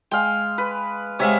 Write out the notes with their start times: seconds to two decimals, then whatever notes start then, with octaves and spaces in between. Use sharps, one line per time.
0.12 G#3 F5 G5
0.58 B4
1.20 C3 G#3 C#5 E5 F5